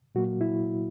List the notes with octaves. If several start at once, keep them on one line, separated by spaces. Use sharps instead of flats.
A#2 F#3 A#3 F#4
E4